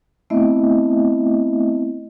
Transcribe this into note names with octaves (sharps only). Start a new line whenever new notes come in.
A3 B3 C4 E4 D#5 E5